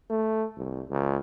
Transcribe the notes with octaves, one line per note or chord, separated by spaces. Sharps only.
A3
C2
C#2